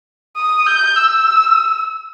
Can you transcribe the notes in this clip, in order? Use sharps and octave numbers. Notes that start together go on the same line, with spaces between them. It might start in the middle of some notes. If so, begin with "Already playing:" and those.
D#6
G6
E6